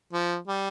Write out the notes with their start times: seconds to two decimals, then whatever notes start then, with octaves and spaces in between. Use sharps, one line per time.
0.13 F3
0.48 G3